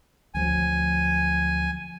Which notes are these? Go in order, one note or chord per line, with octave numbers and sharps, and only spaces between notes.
D2 F3 F#3 G#5